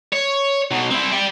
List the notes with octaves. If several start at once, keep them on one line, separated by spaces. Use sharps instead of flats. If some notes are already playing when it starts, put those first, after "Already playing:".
C#5
B2 F#3
C4 E4
D5 G5